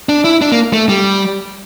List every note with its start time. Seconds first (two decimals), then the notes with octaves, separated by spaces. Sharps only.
0.09 D4
0.25 E4
0.42 D4
0.52 A#3
0.73 A3
0.89 G3